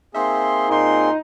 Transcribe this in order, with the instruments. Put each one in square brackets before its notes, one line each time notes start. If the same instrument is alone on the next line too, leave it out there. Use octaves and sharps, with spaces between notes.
[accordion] A#3 C4 G#4 [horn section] D#4 E5 C6
[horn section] A#2 C6 [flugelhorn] D#4